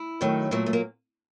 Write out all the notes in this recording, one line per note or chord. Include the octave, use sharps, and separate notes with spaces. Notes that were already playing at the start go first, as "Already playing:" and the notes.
Already playing: E4
F#2 D#3 F#3 A3
A#2 F#3 A3 A#3
A3
A#3